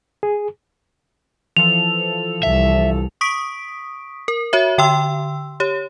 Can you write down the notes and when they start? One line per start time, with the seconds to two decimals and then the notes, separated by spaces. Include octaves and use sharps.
0.23 G#4
1.57 E3 F3 A4 F7
2.43 C2 E5
3.21 C#6 D#6 B6 D7
4.28 A#4
4.53 F#4 C#5 E5
4.78 D3 G5 C6 E6
5.60 G4 C#5